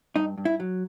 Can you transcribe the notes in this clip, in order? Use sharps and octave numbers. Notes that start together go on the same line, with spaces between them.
G2 D#4
G2
E4
F#3